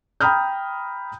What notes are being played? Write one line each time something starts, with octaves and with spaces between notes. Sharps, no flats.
G5 A#5 B5 D#6 F6 G6